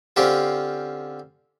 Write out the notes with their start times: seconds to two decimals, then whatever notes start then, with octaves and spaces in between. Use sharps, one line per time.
0.16 D3 C4 C#4 F4 G4 C5